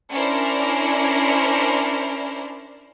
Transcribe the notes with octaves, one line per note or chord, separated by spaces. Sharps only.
C#4 D4 E4 A#4 C5 D5